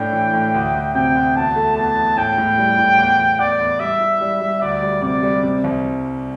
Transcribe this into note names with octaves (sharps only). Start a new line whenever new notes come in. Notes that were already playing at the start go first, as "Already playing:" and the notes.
Already playing: A2 D4 G5
E3
A2
D2
D2
C3 G5
D2
E2 A5
A3
E2 A5
E2
A2 G5
A2
G3
A2
E2
E2
E2 D5
E2
G3 E5
E4
G3
G3
D2 D5
G3
C3 D5
G3
C3
C2